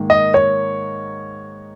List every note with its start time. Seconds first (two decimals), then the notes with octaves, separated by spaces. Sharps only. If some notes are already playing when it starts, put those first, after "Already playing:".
Already playing: G#2 D#3 A#3
0.10 D#5
0.34 C#5